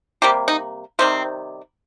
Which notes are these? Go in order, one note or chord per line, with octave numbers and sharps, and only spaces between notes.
C3 G3 A#3 G4
D#4
C3 D#3 G3 C4